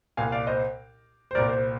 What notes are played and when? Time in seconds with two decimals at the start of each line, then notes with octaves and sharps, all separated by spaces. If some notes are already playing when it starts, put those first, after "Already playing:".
0.17 C2 A#2 F5 G#5
0.32 D5 F5
0.47 C5 D#5
1.31 C5
1.35 C2 A#2 A#4 D5
1.49 C5